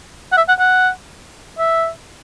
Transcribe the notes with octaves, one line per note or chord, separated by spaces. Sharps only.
F#5
E5
F#5
F#5
E5